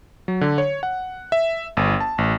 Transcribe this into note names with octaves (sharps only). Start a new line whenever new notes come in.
F#3
D3
C#5
F#5
E5
G1
A5
A1